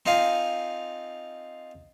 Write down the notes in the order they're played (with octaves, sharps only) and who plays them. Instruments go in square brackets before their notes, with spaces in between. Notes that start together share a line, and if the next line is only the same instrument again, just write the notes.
[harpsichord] C4 D#4 F4 F5 G#5